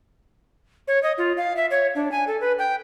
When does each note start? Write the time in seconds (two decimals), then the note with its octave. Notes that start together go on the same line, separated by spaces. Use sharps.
0.88 C#5
1.03 D#5
1.18 F4
1.37 F5
1.57 E5
1.71 C#5
1.95 D4
2.12 G#5
2.27 A4
2.41 B4
2.59 G5